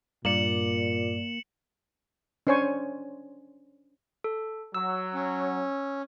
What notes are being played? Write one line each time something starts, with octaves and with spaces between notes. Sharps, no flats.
G2 A#2 A#3 D5 C#7 E7 F#7
C#4 D4 C5 C#5 G#5 C#6
A4
F#3 E6
C#4